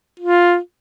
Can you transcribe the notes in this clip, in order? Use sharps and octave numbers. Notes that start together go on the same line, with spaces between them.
F4